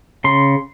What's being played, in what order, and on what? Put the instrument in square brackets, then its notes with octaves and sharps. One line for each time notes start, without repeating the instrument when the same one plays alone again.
[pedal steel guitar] C#3 C6